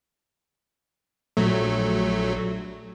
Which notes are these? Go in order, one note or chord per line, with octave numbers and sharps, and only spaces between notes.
A#1 F#3 A3